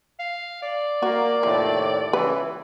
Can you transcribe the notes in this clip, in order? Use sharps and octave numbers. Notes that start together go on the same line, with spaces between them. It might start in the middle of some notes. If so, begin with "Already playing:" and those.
F5
D5
A#3 F#4
D#2 A2 C3 F3
C#2 E3 B4